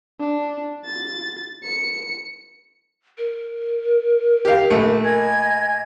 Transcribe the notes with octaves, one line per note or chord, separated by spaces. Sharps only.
D4
A6
C#7
A#4
G4 F5
A#1 A3
D#5 G#5 G#6